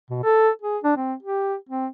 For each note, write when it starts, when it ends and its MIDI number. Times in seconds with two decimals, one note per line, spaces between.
0.10 0.19 47
0.24 0.50 69
0.62 0.78 68
0.84 0.93 62
0.97 1.14 60
1.22 1.55 67
1.69 1.87 60